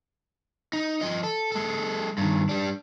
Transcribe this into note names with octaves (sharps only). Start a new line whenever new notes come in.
D#4
F3 D#5
A4
G#3 A4
G2 D#3
G3 D4